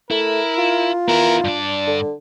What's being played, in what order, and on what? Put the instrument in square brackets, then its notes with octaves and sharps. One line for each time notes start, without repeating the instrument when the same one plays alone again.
[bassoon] A3 [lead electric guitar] E4 [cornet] A#4
[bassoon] F4
[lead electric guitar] B3 E4 [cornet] A#4
[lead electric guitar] G2 D5 [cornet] D4
[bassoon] D3